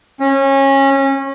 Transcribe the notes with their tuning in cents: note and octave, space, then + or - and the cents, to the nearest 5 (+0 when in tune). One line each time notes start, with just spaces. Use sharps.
C#4 -25